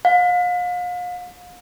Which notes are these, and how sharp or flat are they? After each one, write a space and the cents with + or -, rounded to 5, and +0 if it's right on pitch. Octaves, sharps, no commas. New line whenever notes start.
F5 +40